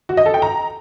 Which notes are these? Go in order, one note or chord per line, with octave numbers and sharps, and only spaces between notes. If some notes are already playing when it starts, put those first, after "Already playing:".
F#4
D#5
A4
G5
A#5